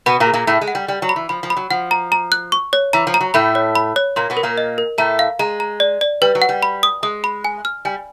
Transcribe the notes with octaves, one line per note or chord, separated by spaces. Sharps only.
B2 B3 B5
A#2 A#3
G#4
A#2 A#3
A2 A3 B5
G#3
F#5
G3
G3 D5
F#3
B5
E3
F3 B5
F3
B5
F#3
F3 F#5
A#5
A#5
F#6
C#6
C#5
E3 A#5
F3
A#5
F#3
A2 A3 B5
C#5
B5
C#5
A#2 A#3 C6
B2 B3
A#4
A#2 A#3
D#5
A#4
A2 A3 A#5
F5
G#3 A#5
A#5
D5
D5
G3 B4
F#3
F#5
G3
B5
D#6
G#3 D#6
B5
G#5
F6
G3 G#5